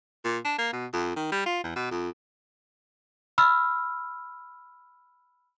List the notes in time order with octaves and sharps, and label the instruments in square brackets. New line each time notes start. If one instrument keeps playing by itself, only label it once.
[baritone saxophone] A#2
D4
A#3
B2
F2
D#3
G3
F4
E2
B2
F2
[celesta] B5 E6 F6